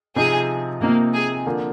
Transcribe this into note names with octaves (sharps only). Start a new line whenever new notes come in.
C3 F3 C4 D#4 G#4
C3 F3 A#3 C4 D#4
G#4
D3 F3 A#3